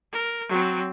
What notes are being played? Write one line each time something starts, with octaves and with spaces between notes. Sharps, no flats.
A#4
F#3 C4